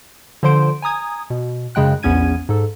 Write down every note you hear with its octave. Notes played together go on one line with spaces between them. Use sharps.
D3 F3 C5 C6 D7
G#5 A#5 D#6 G#6
B2
F#2 C#3 G#3 G5 F#6
A#1 E2 B3 C#4 G#6 D#7
G#2 A4